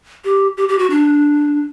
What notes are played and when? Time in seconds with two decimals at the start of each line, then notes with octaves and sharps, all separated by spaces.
0.25 G4
0.57 G4
0.69 G4
0.79 F#4
0.90 D4